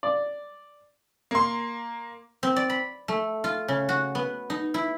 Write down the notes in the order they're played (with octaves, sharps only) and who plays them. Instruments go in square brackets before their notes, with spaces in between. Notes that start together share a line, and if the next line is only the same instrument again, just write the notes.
[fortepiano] D5
[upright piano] A#3 C6
[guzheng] C4
D5
B5
A3
F4
C#3
F#4
B3
D#4
E4